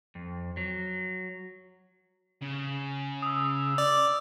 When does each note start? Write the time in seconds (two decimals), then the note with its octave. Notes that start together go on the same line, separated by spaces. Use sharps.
0.15 F2
0.57 F#3
2.41 C#3
3.22 D#6 E6
3.78 D5